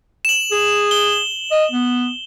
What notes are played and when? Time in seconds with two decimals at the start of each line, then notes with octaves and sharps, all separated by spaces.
0.25 E7 F#7
0.52 G#4
0.91 G7
1.51 D#5
1.72 B3